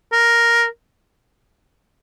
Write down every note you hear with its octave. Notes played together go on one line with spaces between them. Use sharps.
A#4